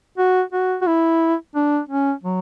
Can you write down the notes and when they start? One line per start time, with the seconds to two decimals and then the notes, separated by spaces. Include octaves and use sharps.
0.18 F#4
0.53 F#4
0.81 F#4
0.87 E4
1.55 D4
1.89 C#4
2.23 F#3